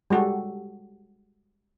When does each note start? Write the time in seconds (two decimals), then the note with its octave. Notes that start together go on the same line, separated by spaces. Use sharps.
0.10 G3 G#3 F#4 G4 A4